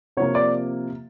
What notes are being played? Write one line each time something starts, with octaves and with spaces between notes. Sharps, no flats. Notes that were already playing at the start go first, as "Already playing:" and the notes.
C3 F3 A#3 C#5
D5